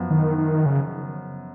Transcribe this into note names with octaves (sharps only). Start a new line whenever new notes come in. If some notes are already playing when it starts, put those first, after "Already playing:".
Already playing: F#2 F3 B3
D#3
D#3
C#3